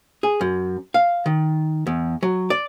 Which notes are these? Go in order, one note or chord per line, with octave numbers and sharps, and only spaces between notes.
G#4
F#2
F5
D#3
E2
F#3
D5